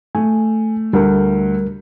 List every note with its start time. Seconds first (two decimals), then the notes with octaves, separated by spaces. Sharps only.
0.15 A3 G#5
0.93 D2 G3 A3 A#4